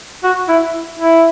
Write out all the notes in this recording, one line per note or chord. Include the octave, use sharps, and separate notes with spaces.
F#4
E4
E4